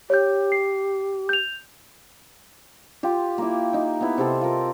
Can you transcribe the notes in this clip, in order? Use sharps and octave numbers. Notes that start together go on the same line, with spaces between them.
G4 C#5 G6
C7
G6 F7
F4 G4
A#3 E4
D#4 G4
B3 E4
C3 C4 A4 F5
F4 A#4